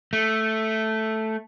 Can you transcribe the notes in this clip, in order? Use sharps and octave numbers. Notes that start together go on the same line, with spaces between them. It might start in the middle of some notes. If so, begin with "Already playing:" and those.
A3